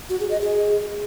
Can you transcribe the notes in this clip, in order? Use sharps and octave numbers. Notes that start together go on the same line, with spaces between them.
F#4
G#4
D#5
G#4